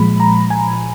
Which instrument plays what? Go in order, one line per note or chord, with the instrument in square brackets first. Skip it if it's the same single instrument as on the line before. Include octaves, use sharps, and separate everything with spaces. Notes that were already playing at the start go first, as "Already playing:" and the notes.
Already playing: [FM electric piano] A#2 F3 G#3 B5
A#5
G#5